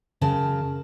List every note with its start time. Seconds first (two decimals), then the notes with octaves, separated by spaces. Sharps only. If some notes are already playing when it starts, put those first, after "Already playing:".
0.21 F#2 C#3 A#4 G5 A5